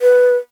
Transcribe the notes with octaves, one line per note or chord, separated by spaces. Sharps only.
B4